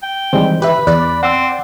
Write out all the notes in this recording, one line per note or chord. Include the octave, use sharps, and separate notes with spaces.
G5
D#3 E3 G3 G#3 C4
G4 B4 E5 B5
E2 D5 F#6
C4 F#5 G5 E6